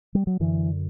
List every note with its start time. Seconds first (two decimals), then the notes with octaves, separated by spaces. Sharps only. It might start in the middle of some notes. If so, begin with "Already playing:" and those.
0.15 G3
0.27 F#3
0.40 F#2 D3 E3